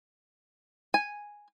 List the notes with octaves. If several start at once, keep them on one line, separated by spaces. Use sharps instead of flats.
G#5